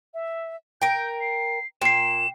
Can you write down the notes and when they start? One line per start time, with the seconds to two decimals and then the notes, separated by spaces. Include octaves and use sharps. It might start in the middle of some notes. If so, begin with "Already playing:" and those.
0.14 E5
0.81 A#4 G5 G6
1.21 C7
1.81 A#2 G5 C7 E7